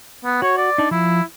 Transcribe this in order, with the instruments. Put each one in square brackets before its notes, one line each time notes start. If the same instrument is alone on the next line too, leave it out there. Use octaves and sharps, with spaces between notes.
[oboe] B3
[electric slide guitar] F#4 [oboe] C#5
[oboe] D5
[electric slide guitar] D4 D#4
[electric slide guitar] F3 [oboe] E4